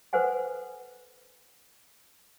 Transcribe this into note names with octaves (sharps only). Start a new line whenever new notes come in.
A4 B4 C5 F#5 G#5